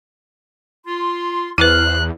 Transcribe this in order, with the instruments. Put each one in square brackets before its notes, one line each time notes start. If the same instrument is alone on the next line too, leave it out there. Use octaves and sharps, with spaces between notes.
[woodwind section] F4 C6
[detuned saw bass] E2 [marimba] E4 B4 [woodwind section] C5 F6 [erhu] F#6